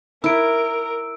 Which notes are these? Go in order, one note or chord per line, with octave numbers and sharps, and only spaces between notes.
E4 A#4 E6 D7